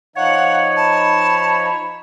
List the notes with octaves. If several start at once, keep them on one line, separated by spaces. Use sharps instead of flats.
F3 D#4 C#5 F5 F#5
A5 B5